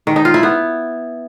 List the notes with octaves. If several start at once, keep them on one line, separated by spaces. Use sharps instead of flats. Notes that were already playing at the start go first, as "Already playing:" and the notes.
D#3
D#4
F4
E4
B3